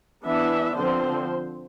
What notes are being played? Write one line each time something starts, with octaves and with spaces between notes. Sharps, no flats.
E3 B3 D4 E5
D3 F3 C4 C5